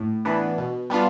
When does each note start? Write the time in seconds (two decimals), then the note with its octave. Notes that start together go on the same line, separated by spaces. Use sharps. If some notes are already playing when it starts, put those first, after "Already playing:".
Already playing: A2
0.25 E3 B3 D4
0.58 B2
0.90 G3 B3 D4 F4